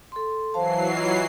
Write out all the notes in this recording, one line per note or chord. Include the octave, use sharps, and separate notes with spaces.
A4 C6
E3 F#3 C5 F5 A5 C7
F4 D#5